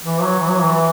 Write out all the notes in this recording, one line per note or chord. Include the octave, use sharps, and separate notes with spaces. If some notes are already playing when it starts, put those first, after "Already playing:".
E3
F#3
E3
F#3
E3